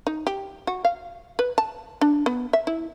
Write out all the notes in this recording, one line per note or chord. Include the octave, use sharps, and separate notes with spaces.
D#4
G4
F#4
F5
B4
A5
D4
B3
E5
E4